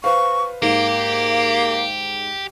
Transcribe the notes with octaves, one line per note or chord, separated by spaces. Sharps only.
B4 C5 F5 C#6
G#2 A#3 G4 F5